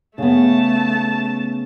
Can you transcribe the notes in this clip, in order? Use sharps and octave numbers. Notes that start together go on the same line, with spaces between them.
C#3 A3 B3 A5